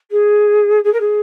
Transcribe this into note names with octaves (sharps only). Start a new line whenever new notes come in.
G#4
G#4
A#4
G#4